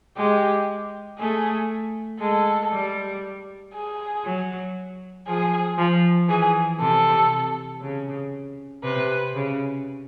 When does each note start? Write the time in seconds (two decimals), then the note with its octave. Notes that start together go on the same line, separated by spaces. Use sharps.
0.17 G#3 G4
1.19 A3 G#4
2.20 G#3 A4
2.72 G3
3.74 G#4
4.24 F#3
5.27 F3 G#4
5.78 F3
6.28 E3 G#4
6.79 C3 A4
7.81 C#3
8.84 C3 B4
9.34 C#3